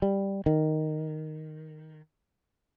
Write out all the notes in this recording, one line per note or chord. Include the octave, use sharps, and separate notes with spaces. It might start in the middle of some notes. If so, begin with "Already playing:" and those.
G3
D#3